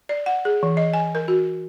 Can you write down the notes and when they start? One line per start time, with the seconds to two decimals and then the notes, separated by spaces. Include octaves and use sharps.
0.09 D5
0.26 F#5
0.45 G#4
0.63 E3
0.77 D#5
0.94 G#5
1.15 A#4
1.28 F#4